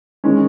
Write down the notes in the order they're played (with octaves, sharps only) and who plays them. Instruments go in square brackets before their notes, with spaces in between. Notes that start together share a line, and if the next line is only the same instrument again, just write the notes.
[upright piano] D#3 G#3 C#4